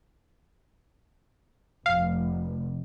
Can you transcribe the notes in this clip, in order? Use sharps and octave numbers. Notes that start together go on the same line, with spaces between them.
F1 F5